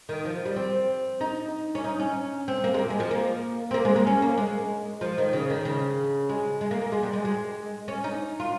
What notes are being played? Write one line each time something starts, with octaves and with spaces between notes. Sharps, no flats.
D#3
F3
G3
C4
D#4
C#4
D#4
C#4
C4
A#3
G#3
A#3
G#3
F3
A#3
C4
A#3
G#3
A#3
C#4
A#3
G#3
F3
D#3
C#3
D#3
C#3
G#3
G#3
A#3
A#3
G#3
G3
G#3
G#3
C#4
D#4
F4